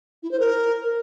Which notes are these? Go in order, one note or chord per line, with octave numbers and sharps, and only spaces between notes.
E4
C5
A#4